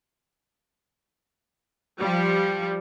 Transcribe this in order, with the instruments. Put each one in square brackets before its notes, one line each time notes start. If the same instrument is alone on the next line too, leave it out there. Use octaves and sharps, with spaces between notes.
[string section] F3 G3